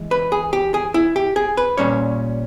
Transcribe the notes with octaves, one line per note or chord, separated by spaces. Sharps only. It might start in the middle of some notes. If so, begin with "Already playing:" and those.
Already playing: E3 G#3
B4
G#4
G4
G#4
E4
G4
G#4
B4
A#2 G3 C#4 C#5